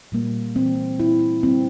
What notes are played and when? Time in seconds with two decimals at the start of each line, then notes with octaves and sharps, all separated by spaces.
0.12 A#2 G3 A#3
0.56 E3 G3 A#3 C4
1.00 A#2 G3 A#3 E4
1.43 D3 G3 A#3 C4